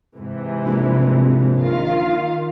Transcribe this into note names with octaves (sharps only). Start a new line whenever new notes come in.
G#2 C3 E3
A#1
D#3 F4 F5